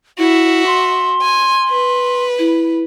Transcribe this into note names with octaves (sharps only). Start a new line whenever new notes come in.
E4 F#4 E5
C6
G#5
B4
E4